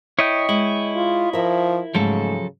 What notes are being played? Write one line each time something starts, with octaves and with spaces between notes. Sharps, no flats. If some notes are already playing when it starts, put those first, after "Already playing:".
E4 C#5 D#5 G5
G#3 E4
F4
F3 A#4 E5
G#2 C#3 F3 F#3 A3 A4